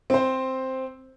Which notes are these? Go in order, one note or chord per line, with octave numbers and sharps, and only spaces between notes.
C4 C5